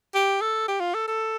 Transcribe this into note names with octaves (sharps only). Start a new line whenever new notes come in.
G4
A4
G4
F4
A4
A4